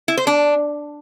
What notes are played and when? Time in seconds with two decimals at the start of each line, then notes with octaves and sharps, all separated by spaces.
0.08 E4
0.17 C5
0.27 D4